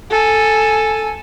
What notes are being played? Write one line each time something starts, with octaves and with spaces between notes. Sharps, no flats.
A4 G#5